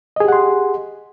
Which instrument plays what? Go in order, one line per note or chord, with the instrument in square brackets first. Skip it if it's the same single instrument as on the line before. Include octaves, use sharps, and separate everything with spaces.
[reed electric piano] D#5
G#4
G4
F#5
C6